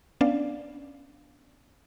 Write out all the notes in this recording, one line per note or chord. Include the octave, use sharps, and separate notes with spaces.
B3 C#4 D4 D5 F5